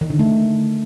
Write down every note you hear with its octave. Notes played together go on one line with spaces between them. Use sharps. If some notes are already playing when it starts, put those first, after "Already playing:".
D#3
D3
A3